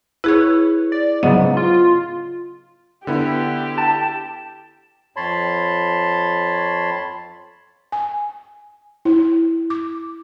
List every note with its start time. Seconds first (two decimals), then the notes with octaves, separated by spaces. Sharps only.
0.24 E4 G#4 B4 C#5
0.92 D5
1.23 G#2 C#3 F#3 B3 D#5
1.57 F4
3.07 D3 B3 E4 G4
3.78 A5
5.16 F2 C#5 A5 B5 C6
7.92 G#5
9.05 E4
9.70 D6